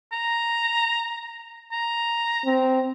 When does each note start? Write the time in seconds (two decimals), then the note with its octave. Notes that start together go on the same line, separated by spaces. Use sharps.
0.12 A#5
1.72 A#5
2.46 C4